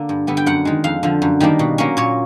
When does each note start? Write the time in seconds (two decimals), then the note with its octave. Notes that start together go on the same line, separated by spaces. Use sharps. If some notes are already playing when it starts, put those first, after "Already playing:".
Already playing: D3 A#3
0.09 G2
0.27 D3 G3 B3
0.37 G5
0.46 F#2 F#5
0.65 D#3 G#3
0.84 F2 F5
1.03 D3 F3
1.22 F#2
1.40 D#3 G3 A#3 D4
1.59 B2
1.78 F#3 A#3 C#4
1.97 A#2 C#5